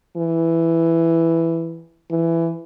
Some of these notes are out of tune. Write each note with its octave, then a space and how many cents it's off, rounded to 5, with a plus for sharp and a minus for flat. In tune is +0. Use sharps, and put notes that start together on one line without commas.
E3 +5
E3 +15